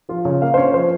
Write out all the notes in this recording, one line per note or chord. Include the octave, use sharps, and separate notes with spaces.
F3 F4
C#3 C#5
A#3 F5
C5
C#4 C#5
F3 C5